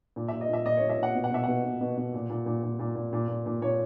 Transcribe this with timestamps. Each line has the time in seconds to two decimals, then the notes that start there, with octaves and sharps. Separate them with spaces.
0.16 A#2
0.28 E5
0.32 A#2
0.41 D#5
0.49 A#2 E5
0.66 A#2 D#5
0.77 C#5
0.81 A#2
0.89 E5
0.98 A#2 F#5
1.15 B2
1.24 F#5
1.30 B2 E5
1.43 B2 F#5
1.64 B2
1.81 B2
1.97 B2
2.14 A#2
2.30 A#2
2.46 A#2
2.63 A#2
2.79 A#2
2.95 A#2
3.13 A#2
3.28 A#2
3.46 A#2
3.61 A#2 C#5